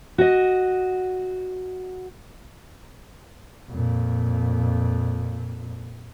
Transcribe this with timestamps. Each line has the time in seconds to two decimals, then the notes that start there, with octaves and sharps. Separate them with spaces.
0.18 F#4 D#5
3.71 F2 A#2